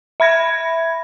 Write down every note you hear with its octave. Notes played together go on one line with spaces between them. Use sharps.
E5 B5 G#6 A#6